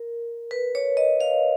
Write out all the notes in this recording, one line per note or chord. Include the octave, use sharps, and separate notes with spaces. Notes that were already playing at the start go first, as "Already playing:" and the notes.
Already playing: A#4
B4
C#5
D#5
F5